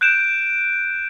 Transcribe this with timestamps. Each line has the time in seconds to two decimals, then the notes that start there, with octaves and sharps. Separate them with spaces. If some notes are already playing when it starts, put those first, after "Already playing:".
0.01 F#6 G6 D7 E7